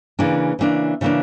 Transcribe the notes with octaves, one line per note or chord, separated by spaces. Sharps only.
C#3 E3 A#3 D4
C#3 E3 A#3 D4
C#3 E3 A#3 D4